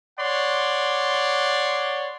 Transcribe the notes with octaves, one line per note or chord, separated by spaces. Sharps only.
C#5 D5 F#5 C6